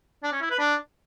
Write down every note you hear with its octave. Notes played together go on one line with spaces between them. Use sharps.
D4
C#4
E4
B4
D4